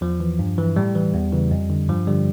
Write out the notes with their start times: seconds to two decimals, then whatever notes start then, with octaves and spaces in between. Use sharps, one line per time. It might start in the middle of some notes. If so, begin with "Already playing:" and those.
0.01 E2 F3
0.20 E3
0.39 G2
0.58 E3
0.76 A2 G3
0.95 E3
1.14 E2
1.33 C#3 E3
1.51 F2
1.70 D3
1.89 G2 F3
2.07 D3 G3